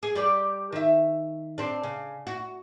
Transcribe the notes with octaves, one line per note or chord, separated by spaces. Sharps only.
G#4
G3 G4 D5
D#3 E5
C4 D4
C#3
F#4